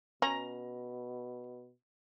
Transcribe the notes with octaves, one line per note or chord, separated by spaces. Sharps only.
B2 C#4 A#5